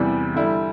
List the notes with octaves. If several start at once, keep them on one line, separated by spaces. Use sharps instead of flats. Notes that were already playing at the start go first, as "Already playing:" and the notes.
Already playing: E2 C3 E3 G3
D3 G3 E4